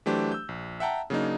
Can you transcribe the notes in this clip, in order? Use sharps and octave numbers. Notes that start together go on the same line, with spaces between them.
E3 F#3 A3 D4 G4 C5
E6 G6
A#1
E5 F#5 G5 A5 A#5
C#3 F#3 A#3 D4 D#4